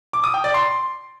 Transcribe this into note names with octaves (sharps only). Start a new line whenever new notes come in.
D6
D#6
G5
D5
C6